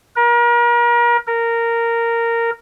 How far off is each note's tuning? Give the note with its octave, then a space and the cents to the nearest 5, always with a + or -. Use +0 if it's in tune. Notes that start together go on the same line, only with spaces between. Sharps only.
A#4 +35
A#4 -10